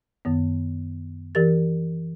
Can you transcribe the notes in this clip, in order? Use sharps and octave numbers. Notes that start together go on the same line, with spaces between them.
F#2 D#3 B3
E3 G4 A#4 A6